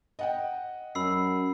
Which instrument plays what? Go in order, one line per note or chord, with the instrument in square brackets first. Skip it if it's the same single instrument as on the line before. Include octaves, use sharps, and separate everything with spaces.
[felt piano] D#5 F#5 G5
[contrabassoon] F#2 [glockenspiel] B5 E6 C7